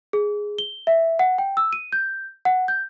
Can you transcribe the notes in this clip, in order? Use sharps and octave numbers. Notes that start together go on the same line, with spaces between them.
G#4
G7
E5
F#5
G5
E6
D#7
G6
F#5
G6